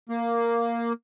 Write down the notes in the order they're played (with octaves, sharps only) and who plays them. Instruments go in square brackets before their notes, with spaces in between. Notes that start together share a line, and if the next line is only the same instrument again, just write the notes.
[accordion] A#3